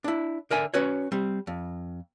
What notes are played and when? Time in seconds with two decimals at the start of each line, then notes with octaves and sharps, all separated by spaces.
0.04 D4 E4
0.50 D3 A#4 E5 G#5
0.74 C#4 F#4 B4 C#5
1.12 G3 C4
1.47 F2